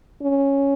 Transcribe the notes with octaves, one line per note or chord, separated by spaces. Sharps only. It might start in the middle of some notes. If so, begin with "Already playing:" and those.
C#4